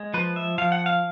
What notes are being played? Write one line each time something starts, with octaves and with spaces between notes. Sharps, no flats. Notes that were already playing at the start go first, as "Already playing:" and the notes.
Already playing: G#3
F3 B4
E5
F3 F5
F#5
F5